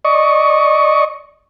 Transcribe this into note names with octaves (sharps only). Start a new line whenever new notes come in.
D5 D#5 C#6